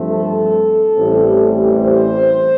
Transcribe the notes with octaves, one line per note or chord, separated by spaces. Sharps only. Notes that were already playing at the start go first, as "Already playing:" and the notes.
Already playing: G2 F3 A3 C4
A4
A1 A2 E3 G3 C4
C5